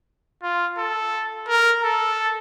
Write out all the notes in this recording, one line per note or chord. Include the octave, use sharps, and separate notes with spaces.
F4
A4
A#4
A4